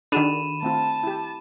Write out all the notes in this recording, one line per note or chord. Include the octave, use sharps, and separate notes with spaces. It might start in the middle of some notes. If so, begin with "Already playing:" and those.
D#3 D4 F#4 G#4 A4 B5 D#7 E7
A3 C4 F4 A5
E4 G4